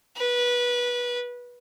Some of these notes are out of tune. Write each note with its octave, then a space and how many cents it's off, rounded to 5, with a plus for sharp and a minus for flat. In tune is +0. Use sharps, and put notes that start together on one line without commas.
B4 -20